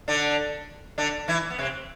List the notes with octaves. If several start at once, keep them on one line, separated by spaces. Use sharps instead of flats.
D3 D4
D3 D4
E3 E4
B3
C3 C4